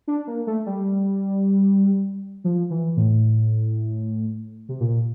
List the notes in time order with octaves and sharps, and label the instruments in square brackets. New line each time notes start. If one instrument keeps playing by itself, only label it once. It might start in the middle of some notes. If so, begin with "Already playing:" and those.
[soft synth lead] D4
A#3
A3
G3
F3
E3
A2
C3
A#2